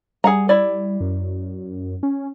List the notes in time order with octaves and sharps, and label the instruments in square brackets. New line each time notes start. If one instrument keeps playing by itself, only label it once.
[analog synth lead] G3 [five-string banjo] G#4 F#5 A#5
[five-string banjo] E4 D5
[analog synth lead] F#2
C#4